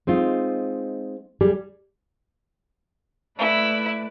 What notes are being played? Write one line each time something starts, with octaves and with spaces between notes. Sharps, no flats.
G#3 C4 D#4 F4
G3 G4 G#4
A3 E4 B4 D5